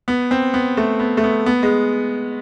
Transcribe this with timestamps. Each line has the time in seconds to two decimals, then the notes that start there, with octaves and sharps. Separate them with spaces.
0.08 B3
0.31 C4
0.54 B3
0.77 A3
1.00 B3
1.17 A3
1.24 B3
1.46 B3
1.63 G#3